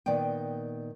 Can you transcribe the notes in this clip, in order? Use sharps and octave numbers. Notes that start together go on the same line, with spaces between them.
A#2 D#3 B3 D5 G5